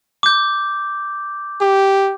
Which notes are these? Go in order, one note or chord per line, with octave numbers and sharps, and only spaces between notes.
D6 G6
G4